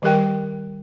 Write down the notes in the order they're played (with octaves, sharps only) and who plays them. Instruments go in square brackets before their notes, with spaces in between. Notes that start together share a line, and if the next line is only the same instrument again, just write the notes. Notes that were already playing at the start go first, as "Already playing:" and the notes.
[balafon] D#3 G3 G4 A#4 G5